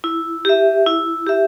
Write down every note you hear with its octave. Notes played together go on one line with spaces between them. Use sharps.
E4
G4 E5
E4
G4 E5